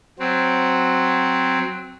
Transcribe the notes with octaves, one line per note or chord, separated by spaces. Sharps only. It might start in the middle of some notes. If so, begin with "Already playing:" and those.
F#3 C4